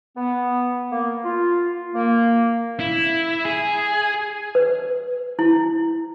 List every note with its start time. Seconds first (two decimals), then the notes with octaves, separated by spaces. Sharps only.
0.17 B3
0.92 A#3
1.25 F4
1.95 A#3
2.80 E4
3.45 G#4
4.55 B4
5.39 E4